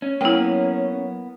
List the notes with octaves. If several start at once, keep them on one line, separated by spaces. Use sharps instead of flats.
C#4
F#3 A#3 B3 E4 G5